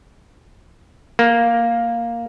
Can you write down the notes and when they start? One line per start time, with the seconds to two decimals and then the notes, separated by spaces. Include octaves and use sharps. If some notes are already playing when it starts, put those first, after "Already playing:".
1.19 A#3